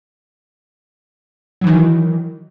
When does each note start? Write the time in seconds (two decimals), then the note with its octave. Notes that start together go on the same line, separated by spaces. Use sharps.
1.61 F#3
1.64 E3
1.66 D#3